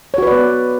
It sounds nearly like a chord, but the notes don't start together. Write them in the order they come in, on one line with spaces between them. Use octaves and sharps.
C#5 F#4 B4 D5 B3